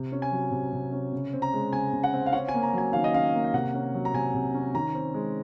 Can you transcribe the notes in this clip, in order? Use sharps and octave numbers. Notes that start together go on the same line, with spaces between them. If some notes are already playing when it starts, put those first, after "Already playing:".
Already playing: C3
C#4
G#5
F#3
C3
C3
C#4
C#3
C4
A#5
G#3
C#3 G#5
C#3
F#5
C4
F5
C#4 F#5
G#5
A#3
A#5
F#3 G#5
D#3 F5
D#5
C#4 F5
A#3
F5
C3 F#5
C#4
F#3
A#5
C3 G#5
C3
C#4
D#3 A#5
C4
G#3